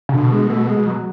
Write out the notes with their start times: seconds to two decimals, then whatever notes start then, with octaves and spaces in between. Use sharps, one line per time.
0.09 C#3
0.13 B2 D3
0.32 G#3
0.50 A3
0.69 G#3
0.87 F#3